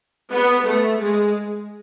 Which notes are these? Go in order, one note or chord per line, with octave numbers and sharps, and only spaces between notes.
B3
A3
G#3